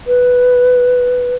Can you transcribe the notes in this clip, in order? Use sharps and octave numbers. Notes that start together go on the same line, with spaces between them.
B4